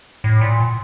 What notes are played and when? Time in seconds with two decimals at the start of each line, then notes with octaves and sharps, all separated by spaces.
0.24 A2
0.41 A#2